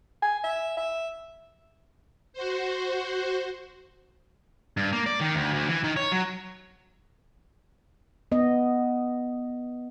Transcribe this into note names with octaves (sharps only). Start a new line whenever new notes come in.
G#5
E5
E5
F#4 C5
G2
A#3
D5
D#3
D2
D2
E3
D#3
C#5
F#3
B3 D#5